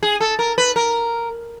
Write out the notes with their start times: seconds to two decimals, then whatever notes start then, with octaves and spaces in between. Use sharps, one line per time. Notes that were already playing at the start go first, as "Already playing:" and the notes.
0.03 G#4
0.21 A4
0.39 A#4
0.58 B4
0.76 A#4